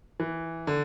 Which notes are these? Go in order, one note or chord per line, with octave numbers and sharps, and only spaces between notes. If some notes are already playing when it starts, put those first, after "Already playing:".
E3
D3